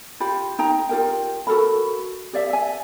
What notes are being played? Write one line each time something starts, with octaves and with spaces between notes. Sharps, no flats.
F4 G4 B5
D#4 G5 A#5
F4 G4 A#4 G5
F#4 A4 A#4 B5
G4 D5 E5
E5 G#5